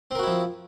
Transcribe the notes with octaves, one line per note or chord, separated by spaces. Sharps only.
F3 C4 E4 F#4 A#4